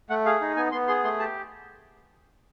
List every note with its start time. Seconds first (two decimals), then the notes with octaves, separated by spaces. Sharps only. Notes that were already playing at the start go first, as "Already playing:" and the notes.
0.10 A3 F#5
0.25 G#4 F5
0.41 D#4
0.56 B3 G#5
0.72 B3 C6
0.88 G#4 C6
1.04 A3 C6
1.20 G4 A5